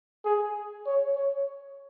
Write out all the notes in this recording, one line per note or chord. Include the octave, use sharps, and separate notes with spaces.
G#4
C#5
C#5